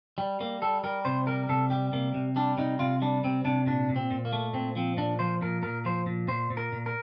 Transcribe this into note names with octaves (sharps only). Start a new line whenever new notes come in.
G3
G3 A#3
G3 A4
G3 A#4
C3 C5
G3 A#4
C3 A4
G3 G4
C3 A#3
C3
G3 D4
C3 D#4
C3 F4
G3 D4
C3 C4
C3 D4
A#2 D4
A#2
C4
A#2
A#3
A3
A#2 C4
F3 C4
A#2 D4
F3 C5
A#2 A#4
A#2 A#4
F3 C5
A#2
A#2 C5
A#2
A#4
A#2
A#4